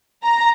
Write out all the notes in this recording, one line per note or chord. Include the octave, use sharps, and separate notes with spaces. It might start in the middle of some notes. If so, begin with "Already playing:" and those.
A#5